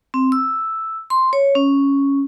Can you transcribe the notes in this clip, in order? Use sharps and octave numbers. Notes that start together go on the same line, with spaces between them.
C4
E6
C6
C#5
C#4